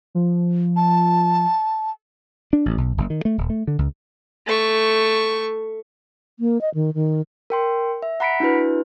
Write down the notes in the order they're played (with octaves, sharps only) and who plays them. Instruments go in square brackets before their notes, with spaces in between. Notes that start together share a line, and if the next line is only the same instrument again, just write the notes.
[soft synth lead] F3
[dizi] A5
[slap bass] D4
A1
B1
F#1
D#3
A3
D#1
A3
D3
C#2
[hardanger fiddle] A3 C#6
[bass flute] A#3
D#5
D#3
D#3
[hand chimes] A#4 G5 C6
E5
F#5 A#5 B5 B6 C#7 D7
D4 E4 F#4 B4